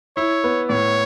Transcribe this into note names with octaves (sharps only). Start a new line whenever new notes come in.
E4 C#5
B3
A2 C#5